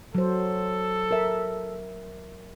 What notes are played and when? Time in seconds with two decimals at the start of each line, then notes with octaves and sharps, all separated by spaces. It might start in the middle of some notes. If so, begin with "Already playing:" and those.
0.15 F#3 A4 C5
1.11 A#4 E5